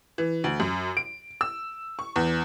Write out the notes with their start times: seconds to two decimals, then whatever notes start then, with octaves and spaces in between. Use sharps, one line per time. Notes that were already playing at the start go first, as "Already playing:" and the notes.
0.18 E3
0.44 D2
0.60 F#2
0.97 D7
1.41 E6
1.99 C#6
2.16 E2